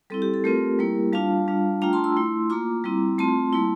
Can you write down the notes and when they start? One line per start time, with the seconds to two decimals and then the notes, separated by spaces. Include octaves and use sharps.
0.10 G3 C4 E4 A4
0.22 G4
0.34 A4
0.44 A3 C4 F4 G4 A#4
0.79 G3 A#3 E4
1.13 G3 D4 F4 F5 A5
1.48 G3 D4 F4
1.82 A3 D4 F4 G5 A#5
1.93 A5 C6
2.04 C6 E6
2.17 A3 E4
2.50 A#3 F4 A#5 D6
2.84 G3 C4 E4
3.18 A3 C4 F4 A5 C6
3.53 G3 A#3 E4